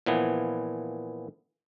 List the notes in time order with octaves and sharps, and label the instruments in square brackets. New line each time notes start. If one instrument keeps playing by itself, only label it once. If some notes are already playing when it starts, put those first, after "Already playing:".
[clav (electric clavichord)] A#2 E3 F3 B3